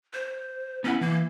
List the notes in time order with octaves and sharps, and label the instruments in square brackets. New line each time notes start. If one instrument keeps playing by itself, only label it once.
[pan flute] C5
[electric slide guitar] B3 E4 F#5 [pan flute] C#4
[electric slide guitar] E3 [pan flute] A#3